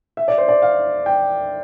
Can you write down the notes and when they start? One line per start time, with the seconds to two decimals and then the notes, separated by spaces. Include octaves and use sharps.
0.17 E5
0.28 D5
0.38 C5
0.48 D5
0.62 F5
1.06 G5